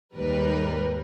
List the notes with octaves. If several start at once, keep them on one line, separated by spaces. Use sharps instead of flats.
D#2 G#2 G3 A#4 B4